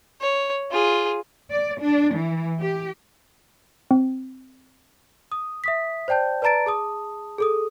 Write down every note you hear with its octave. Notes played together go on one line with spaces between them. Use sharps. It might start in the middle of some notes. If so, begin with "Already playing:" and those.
C#5
F4 G#4
D5
D4
E3
G4
C4
D#6
E5 D#6 B6
C5 D5 G5 A5 G6
B4 D5 A5 A#5 A6 D7
G#4 A5 D#6
G#4 A4 D#6